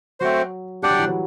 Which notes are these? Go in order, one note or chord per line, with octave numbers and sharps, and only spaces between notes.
F#3 A3 C4 F#4 C5
G3 D4 G4 D5 F#5
F#3
E3
F#3